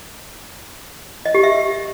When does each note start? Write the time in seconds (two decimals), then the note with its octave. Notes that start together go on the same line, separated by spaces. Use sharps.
1.26 D#5
1.34 G4
1.43 E5